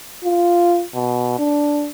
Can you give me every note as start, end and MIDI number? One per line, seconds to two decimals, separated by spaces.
0.24 0.84 65
0.95 1.37 47
1.39 1.91 62